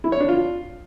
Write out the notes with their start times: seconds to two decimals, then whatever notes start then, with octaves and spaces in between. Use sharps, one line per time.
0.04 E4
0.12 C#5
0.20 D4
0.29 F4